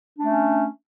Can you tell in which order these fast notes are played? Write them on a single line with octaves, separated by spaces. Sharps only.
D4 A3 C#4